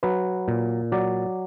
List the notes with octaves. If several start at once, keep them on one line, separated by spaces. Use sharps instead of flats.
F#3 B4
A#2
F#3 D5